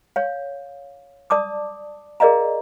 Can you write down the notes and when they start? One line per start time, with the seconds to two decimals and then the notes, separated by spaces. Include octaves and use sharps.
0.16 C#5 F5
1.30 D5 A5 D6 D#6
2.20 G#4 A#4 D5 D#5 F5 A#5